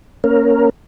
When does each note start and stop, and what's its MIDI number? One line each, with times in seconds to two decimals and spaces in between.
0.24 0.70 58
0.24 0.70 61
0.24 0.70 70